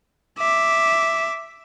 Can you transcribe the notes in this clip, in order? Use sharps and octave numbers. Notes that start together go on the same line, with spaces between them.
E5 D6